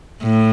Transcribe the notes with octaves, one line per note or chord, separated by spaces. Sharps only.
A2